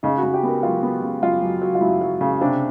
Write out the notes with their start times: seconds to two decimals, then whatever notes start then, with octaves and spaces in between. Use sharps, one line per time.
0.03 C#3 D#4
0.18 F#4
0.23 C#3
0.34 G4
0.43 B3 A#4
0.63 F#3 F4
0.83 B3
1.02 C#3
1.22 F#2 F4
1.42 F#2
1.62 F#3
1.75 F4
1.81 F#2 E4
2.01 F#3
2.21 C#3
2.41 C3 D4